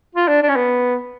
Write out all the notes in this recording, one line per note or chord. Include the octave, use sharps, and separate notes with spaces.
F4
D4
D4
C#4
B3